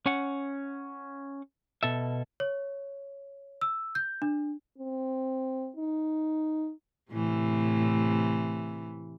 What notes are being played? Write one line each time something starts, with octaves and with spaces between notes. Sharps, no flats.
C#4 F#5
B2 A4 E5
C#5
E6
G6
D4
C4
D#4
A2 C3 E3